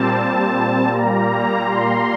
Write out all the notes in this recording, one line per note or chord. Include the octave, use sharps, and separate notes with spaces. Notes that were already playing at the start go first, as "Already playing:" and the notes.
Already playing: A#2 G3 C4 A5
A5
A#2 G3 A#3 A#5
C6